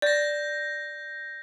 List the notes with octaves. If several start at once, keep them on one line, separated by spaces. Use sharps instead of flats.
D5 G6 A#6